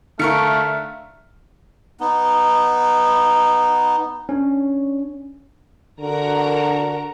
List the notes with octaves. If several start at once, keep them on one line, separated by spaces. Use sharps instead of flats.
D3 A3 A4 A#4 E5 F5 C#6 C#7
B3 D#4
C#4 D4 C#5
D3 F#4 A#4 A#5